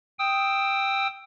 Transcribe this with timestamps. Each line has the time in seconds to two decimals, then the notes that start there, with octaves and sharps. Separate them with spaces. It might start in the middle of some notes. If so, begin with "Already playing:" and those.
0.19 G5 D#6 E6